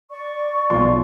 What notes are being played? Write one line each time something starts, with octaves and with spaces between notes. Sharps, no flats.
D5 C#6
B1 F4 C6